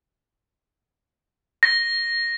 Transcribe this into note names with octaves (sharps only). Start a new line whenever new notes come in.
A#6